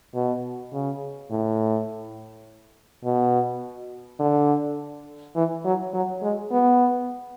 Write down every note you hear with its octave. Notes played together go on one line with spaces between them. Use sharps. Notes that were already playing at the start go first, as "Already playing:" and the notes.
B2
C#3
A2
B2
D3
E3
F#3
F#3
G#3
B3